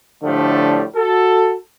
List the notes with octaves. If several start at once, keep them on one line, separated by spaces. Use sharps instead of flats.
A2 D3 F3 G3 A3
F#4 A4